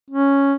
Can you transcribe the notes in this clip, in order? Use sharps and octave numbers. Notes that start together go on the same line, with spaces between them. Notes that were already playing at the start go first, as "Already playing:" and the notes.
C#4